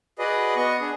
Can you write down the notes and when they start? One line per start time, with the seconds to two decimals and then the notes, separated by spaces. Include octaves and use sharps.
0.19 F#4 G#4 B4 D5 D#5
0.56 B3 D#5 C#6
0.81 B3 D4 G#4